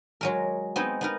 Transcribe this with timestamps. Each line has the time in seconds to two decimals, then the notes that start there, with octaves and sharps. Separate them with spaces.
0.21 F#3 G#3 A#4
0.76 B3 C4 D#4 G#4
1.01 B3 D#4 A#4